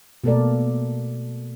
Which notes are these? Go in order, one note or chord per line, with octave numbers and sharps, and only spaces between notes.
B2 A3 A#3 A4 A#4 D5